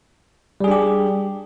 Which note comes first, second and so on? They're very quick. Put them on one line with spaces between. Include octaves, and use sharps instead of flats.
G3 G#4 D4 G4